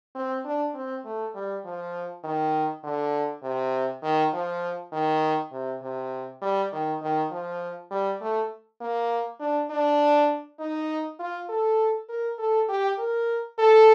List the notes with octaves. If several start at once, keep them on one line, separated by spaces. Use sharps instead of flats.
C4
D4
C4
A3
G3
F3
D#3
D3
C3
D#3
F3
D#3
C3
C3
G3
D#3
D#3
F3
G3
A3
A#3
D4
D4
D#4
F4
A4
A#4
A4
G4
A#4
A4